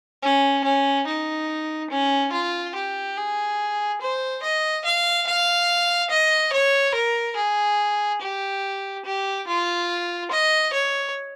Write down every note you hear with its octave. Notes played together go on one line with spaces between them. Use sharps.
C#4
C#4
D#4
C#4
F4
G4
G#4
C5
D#5
F5
F5
D#5
C#5
A#4
G#4
G4
G4
F4
D#5
C#5